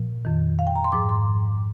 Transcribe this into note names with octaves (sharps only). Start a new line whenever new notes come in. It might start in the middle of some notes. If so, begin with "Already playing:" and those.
Already playing: A#2 F3
F2 D#3
F5
G5
A#5
C6
G#2 F3 D6
C6